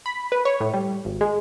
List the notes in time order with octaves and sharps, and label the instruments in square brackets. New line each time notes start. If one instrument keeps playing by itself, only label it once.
[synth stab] B5
B4
C#5
A2
G3
G#1
G#3